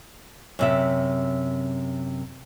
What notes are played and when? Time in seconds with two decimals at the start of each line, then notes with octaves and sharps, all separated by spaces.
0.59 F#2 C3 E5